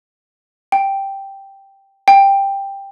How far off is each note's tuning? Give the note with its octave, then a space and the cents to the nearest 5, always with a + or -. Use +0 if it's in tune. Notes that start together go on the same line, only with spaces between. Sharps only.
G5 +0
G5 +10